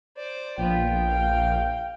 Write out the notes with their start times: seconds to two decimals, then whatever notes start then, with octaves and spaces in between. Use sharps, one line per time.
0.17 C5 D5
0.58 A#1 B3 F4 G5
1.08 F5